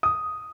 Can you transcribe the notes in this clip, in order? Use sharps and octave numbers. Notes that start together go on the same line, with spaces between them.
D#6